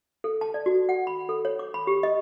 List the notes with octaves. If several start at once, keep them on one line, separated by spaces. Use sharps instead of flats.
A4
A5
D5
F#4
F#5
B5
A4
C#5
D6
B5
G4
D#5